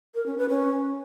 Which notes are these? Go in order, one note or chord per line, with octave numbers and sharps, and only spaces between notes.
A#4
C#4
B4
C#4